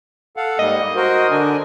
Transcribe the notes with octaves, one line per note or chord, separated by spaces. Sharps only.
A4 F5 F#5
G#2 G3 A#3 D#5
F#4 A#4 C5
D3 D4 G#5